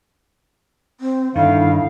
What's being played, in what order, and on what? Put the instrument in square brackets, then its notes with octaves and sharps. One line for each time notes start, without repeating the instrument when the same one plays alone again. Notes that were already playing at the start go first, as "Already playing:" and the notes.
[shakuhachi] C4
[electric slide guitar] G2 D#3 [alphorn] D3 [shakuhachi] E4 [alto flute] F5